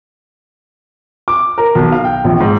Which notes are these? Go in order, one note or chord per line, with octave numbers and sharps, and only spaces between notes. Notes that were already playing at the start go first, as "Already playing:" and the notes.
D6
A#4
B1
F5
G5
A#1
G#2